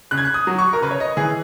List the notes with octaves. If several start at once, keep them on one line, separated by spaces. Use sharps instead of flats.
C#3 F#6
G#6
F#6
D#6
F#3
C#6
A#4
C#3 B4
C#5
D#5
E3 G#4